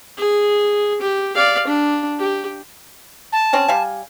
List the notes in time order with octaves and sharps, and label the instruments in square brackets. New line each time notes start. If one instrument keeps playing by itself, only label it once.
[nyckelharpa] G#4
G4
D5 F5
D4
G4
[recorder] A5
[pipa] C4 C#4 G#4
G3 F5 G#5